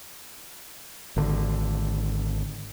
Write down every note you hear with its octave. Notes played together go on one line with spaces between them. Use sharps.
G#1 D3